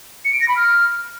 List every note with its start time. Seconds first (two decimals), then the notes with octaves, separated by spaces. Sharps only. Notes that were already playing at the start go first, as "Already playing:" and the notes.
0.25 C#7
0.33 D7
0.41 A#6
0.48 B5
0.56 F6